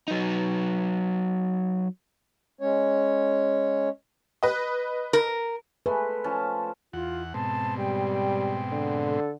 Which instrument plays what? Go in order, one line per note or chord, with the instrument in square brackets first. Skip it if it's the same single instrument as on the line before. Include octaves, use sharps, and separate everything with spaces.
[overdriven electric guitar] F#3 D#4
[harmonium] G#3 C#4 C#5
[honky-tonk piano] B4 D#5
[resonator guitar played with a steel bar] A#4
[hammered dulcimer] G#3 A3 [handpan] B4
[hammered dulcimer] F3 C#4 A5
[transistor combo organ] E2 F#5 [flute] F4
[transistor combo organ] G#2 B2 C4 [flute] A5
[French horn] G3 [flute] G5
[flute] G5
[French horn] D3
[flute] A4